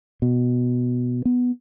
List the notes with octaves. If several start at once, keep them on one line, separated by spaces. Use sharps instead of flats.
B2
B3